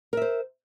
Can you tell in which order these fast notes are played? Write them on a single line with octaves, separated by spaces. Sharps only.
A#4 E5 C5